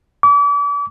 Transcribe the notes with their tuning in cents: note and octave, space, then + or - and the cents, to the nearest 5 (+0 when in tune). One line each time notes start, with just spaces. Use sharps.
D6 -40